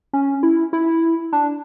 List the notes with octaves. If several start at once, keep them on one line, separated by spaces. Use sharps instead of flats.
C#4
E4
E4
D4